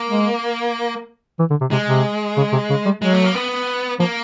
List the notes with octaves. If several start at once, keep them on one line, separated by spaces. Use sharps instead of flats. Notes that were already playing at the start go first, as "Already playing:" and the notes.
Already playing: A#3
G#3
E3
D3
C3
C3 G#3
C3
C#3
C3
C#3
G3
F#3 G#3
A3
A#3
B3
F3 A#3